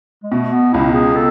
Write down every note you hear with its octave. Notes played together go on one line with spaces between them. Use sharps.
G#3
B2 A3
B3
C#2 E4
G#4
A4